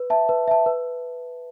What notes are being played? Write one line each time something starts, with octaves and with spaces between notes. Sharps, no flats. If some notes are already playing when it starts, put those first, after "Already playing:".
Already playing: B4
E5 A5
B4
E5 A5
B4